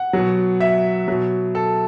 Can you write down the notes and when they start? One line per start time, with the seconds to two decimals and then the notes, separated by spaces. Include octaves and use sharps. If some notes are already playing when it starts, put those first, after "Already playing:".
Already playing: F#5
0.13 B2 F#3
0.60 E5
1.08 B2 F#3
1.55 A4